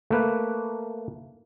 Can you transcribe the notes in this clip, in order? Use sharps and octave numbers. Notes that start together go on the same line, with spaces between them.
A3 A#3 B4